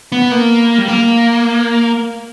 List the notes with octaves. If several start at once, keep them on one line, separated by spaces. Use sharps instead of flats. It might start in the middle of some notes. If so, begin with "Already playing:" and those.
B3
A#3
G3
A#3